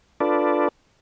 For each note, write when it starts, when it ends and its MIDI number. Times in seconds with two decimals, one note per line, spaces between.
0.20 0.68 62
0.20 0.68 65
0.20 0.68 69
0.20 0.68 71
0.20 0.68 74